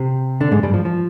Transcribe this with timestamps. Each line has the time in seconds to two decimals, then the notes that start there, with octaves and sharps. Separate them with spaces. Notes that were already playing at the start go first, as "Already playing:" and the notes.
Already playing: C3 C4
0.41 D3 D4
0.51 G#2 G#3
0.63 G2 G3
0.74 F3
0.85 F3